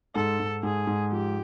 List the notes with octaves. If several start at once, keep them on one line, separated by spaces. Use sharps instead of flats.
G#2 A4
G#2
G#2 G#4
G#2
F3 G4